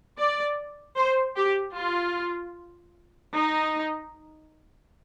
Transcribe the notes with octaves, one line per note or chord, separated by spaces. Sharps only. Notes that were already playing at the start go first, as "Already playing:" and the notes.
D5
C5
G4
F4
D#4